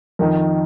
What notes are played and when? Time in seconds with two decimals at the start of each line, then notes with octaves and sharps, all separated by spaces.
0.19 F2 D#3 A#4